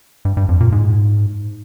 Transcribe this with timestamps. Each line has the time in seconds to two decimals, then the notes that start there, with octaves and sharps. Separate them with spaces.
0.25 G2
0.37 G2
0.49 F2
0.60 A#2
0.72 G#2